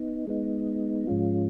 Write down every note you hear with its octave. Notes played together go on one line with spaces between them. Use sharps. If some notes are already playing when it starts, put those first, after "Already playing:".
Already playing: B3 D#4
G#3 B3 D#4
G#2 F3 G#3 C#4 F4